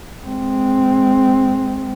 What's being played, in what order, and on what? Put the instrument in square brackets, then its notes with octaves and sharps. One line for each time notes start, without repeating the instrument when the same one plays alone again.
[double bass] G#3 C4